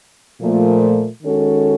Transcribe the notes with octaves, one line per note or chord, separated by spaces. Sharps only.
A#2 F3 A3
D#3 G#3 C#4 F#4 A4